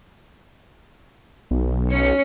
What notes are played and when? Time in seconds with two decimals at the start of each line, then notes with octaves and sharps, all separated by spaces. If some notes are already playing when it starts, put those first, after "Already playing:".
1.51 B1
1.90 C#4 C#5